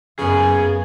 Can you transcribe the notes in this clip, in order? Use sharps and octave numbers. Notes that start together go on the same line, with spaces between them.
F#2 C#3 B3 G#4